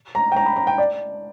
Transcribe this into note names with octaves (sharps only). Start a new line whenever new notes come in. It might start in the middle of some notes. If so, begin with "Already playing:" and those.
A#5
G5
A#5
B5
A#5
G5
D5